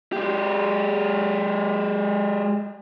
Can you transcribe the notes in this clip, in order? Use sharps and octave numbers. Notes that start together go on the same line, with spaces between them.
G#3 G4